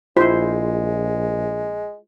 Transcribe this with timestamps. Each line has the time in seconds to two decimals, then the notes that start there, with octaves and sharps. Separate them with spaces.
0.17 A#1 G#3 E4 F4 C5